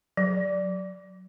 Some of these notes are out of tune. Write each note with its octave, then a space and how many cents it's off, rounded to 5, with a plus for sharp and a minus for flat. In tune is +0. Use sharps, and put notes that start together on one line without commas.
F#3 +0